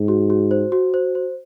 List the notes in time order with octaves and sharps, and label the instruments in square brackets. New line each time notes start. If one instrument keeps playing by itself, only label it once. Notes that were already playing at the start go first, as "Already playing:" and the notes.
Already playing: [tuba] G#2
[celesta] F#4
F#4
C5
F#4
C5
C5